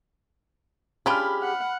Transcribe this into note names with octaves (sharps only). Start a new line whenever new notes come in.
C#4 D4 F4 G4 G#4 B5 F6
F#5